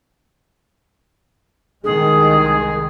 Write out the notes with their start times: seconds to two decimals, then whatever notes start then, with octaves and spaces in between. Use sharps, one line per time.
1.84 C2 D#3 G#3 G#4